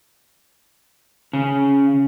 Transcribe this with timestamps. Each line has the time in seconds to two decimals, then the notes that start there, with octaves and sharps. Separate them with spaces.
1.33 C#3